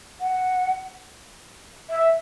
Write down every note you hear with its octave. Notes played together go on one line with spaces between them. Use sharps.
F#5
E5